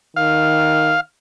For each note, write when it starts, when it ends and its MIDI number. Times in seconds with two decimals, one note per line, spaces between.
0.16 0.95 51
0.16 1.00 77